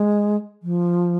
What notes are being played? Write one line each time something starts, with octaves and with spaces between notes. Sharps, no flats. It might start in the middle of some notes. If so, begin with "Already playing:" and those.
Already playing: G#3
F3